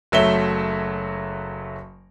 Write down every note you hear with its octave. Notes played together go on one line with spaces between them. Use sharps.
F#1 F#3 A3 E5 G7